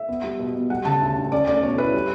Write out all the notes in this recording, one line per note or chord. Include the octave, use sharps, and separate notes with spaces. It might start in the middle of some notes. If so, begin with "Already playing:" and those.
Already playing: E5
B3
G3
B2
B2
G3 F#5
C#3 A5
D2
D2
C#4 D5
A3 D5
B2 C#5
E4 B4
G3